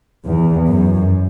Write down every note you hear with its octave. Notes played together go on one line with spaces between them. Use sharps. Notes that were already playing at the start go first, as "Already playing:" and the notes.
E2
F#2